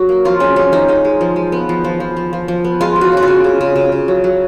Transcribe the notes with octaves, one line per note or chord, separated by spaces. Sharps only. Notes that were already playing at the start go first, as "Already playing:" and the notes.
Already playing: F#3 F#4
A#3
F3 F4
G#3 C#4
G#3 C#4
F3 D#4
G#3 D#4
G#3
F3
G#3
B3
F3
F3
F3
F3
F3
F3
B3
G#3 F4
G#3
F#4
C#3
F#4
C#3 F4
C#3
C#3
C#3
C#3
F#3
F#3